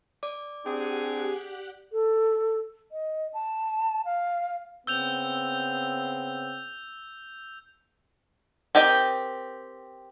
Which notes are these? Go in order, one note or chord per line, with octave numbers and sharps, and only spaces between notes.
D5 D6
C4 D4 G4 G#4 F#5 F#6
A4
D#5
A5
F5
C#3 B3 C4 E6 G6 F7
C4 G4 A#4 D#5 G5